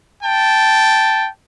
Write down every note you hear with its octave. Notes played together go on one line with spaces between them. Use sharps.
G5 A5